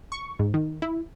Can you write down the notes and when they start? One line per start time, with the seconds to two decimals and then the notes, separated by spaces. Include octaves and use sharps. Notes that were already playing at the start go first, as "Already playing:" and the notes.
0.12 C#6
0.39 G#2
0.54 D#3
0.82 E4